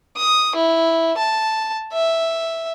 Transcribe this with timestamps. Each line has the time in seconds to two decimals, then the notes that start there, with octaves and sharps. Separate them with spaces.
0.17 D#6
0.55 E4
1.17 A5
1.92 E5